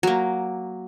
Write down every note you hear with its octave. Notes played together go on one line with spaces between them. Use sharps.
F#3 A#3